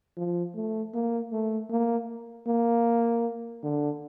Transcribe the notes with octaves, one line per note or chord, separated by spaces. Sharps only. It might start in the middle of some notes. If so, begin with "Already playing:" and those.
F3
A3
A#3
A3
A#3
A#3
D3